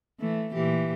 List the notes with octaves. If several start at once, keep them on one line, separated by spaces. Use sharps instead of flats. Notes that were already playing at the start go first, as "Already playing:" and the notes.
E3 A3
A#2 E3 G4